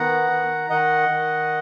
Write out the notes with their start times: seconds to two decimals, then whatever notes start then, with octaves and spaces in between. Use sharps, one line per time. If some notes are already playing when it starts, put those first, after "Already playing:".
Already playing: D#3 B3 F#5 A#5
0.30 D#3
0.70 D#3 D#5 F#5
1.09 D#3